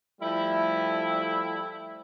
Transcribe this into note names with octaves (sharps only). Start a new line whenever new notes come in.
F3 G3 A3 E4